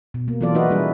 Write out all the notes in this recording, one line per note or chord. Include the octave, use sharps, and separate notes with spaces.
B2
A#3
E3 F#3 B3 F4 A4 D5
D#4 E4 F#4 B4 D#5
G3 C#4 E4 G#4